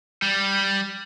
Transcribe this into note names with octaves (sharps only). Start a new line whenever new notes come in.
G3